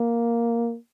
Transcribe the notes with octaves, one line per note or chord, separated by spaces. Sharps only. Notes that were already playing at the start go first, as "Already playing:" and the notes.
Already playing: A#3